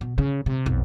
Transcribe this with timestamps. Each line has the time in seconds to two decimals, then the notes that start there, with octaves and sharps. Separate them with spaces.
0.01 B2
0.18 C#3
0.46 C3
0.66 B1 F2